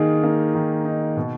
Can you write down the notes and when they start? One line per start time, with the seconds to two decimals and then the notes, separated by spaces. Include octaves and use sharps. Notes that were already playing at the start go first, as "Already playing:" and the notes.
Already playing: D#3 A#3 D#4 G#4
0.23 A#3
0.54 D#3
0.85 D#4
1.17 B2